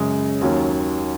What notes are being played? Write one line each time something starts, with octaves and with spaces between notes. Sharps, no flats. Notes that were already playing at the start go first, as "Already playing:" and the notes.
Already playing: F#2 C#3 G#3
D#2 D#3 F#3 C#4